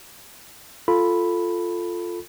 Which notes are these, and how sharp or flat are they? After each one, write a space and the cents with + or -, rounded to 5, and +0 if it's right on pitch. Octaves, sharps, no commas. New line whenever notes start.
F4 +0 A4 +0 B5 +0